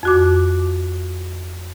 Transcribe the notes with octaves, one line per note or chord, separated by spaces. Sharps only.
F2 F#4 D6